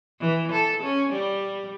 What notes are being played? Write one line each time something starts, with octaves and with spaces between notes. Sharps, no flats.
E3
A4
C#4
G3